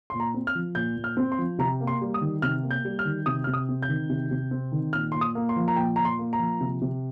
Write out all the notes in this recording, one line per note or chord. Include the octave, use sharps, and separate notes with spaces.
A#2 C6
A#5
C4
F6
F3
A#2 G6
A#2
F6
C4
C6
F3
C3 A#5
A#3
C6
G3
D#6
D#3
C3 F6
A#3
G6
G3
F6
D#3
C3 D#6
C3 F6
D#6
C4
G6
D#3
C3
C3
C4
D#3
A#2 F6
A#2 C6
D#6
A#3
C6
F3
A#5
A#2 G5
A#2 A#5
C6
A#3
A#5
F3
C3
C3